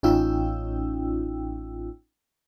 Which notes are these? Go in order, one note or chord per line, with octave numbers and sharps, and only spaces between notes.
A1 C#4 D#4 F4 G5 E6